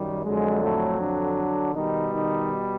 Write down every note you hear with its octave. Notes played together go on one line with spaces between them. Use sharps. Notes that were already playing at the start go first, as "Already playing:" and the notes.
Already playing: F#2 D#3 G3
F2 D3 F#3 G#3
A2 A3
D3 D4
B2 D#3 G3 D#4
D#3 D#4